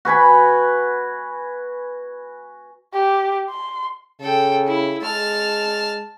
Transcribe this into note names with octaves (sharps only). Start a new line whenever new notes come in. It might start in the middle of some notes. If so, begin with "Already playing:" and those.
F#4 B4 G#5 B5
G4
C6
C#3 A4 G5
E4
G#3 A5 F6